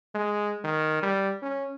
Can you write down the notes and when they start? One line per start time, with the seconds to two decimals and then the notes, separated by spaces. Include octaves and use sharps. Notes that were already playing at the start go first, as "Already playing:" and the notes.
0.15 G#3
0.64 D#3
1.03 G3
1.42 C#4